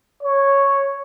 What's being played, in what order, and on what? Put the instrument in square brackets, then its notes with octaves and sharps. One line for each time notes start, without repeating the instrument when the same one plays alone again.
[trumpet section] C#5